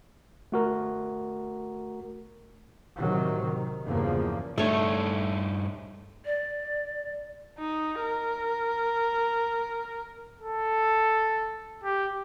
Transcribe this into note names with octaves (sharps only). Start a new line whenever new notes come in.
A3 F#4 A#4
A2 C3 D#3 F#3
D#3
E2 G2 C#3 F3 A#3
G2 A3 D4 D#4 C#5
D5
D#4
A#4
A4
G4